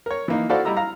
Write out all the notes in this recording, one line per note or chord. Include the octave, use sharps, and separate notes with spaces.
A#4 C#5
E3 A#3 D#4
E4 F#4 A4 C5 D5 F5
G3 E4 D#5 A#5 E6
F5 A#5